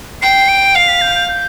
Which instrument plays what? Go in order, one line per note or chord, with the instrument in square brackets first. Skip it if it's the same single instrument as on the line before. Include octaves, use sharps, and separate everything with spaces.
[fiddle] G5 [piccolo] C7
[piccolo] D7
[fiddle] F5 [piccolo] C7
[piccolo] B6
G6
G6
G6